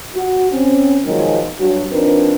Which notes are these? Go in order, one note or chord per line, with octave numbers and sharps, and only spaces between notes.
F#4
C4 C#4
B2 D#3 F3 F#3 G#3
G2 F#3 F#4
F3 C4 D4 D#4 A#4 B4